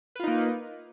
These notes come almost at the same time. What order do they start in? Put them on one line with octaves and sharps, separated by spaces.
B4 F4 D#4 A#3